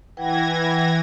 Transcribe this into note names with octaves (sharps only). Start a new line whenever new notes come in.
E3 B4 F#5 G5 G#6 A#6